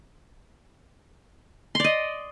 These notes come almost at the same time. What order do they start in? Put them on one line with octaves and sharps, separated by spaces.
C6 D5 D#5